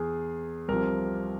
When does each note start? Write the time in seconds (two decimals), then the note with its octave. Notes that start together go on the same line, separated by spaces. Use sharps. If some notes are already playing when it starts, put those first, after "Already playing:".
Already playing: E2 E3 G#4
0.68 C2 C3 F3 A#4